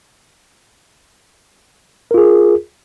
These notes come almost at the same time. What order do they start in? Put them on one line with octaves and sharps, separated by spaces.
A#4 F4 G#4